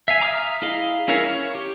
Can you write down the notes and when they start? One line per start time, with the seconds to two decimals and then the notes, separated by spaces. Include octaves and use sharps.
0.08 E5 F5 G#5
0.20 E5 A#5 D6 D#6 F6
0.62 E4 G#4 D#5 F5
1.08 C#4 E4 A#4 C#5 F5
1.30 C#5
1.55 G4